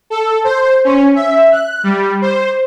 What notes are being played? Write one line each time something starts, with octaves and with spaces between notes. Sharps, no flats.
A4
C5
C#4
E5
F#6
G3
C5